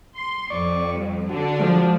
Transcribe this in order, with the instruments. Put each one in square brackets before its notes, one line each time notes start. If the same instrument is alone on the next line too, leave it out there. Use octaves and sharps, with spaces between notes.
[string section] C6
[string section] F2 [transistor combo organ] D5 C#6
[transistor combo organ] G3
[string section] D3 D4 [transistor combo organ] F#4
[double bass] F3 [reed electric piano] G#3